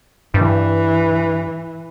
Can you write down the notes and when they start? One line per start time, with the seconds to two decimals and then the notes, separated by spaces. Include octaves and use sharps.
0.34 G2 E3